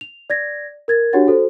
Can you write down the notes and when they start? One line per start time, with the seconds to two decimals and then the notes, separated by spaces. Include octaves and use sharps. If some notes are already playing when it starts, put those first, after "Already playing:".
0.01 F7
0.30 D5 G#6 A#6
0.88 A#4 G#6 A6
1.13 D4 F#4 G4 C#5 F#5 A6
1.27 F#4 A4 C5